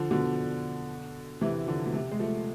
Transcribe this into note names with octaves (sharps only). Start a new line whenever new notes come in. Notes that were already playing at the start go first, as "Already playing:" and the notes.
Already playing: D3 F3
B2 D3
C3 E3
D3 F3
B2
C3
G#3
F3 A3